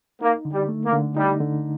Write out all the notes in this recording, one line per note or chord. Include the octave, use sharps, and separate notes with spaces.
A#3 D#4
D3
G3
A3
A#3
D3
G3 D#4
D3